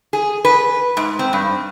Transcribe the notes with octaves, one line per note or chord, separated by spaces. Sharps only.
G#4
B4
G#2
C4
G2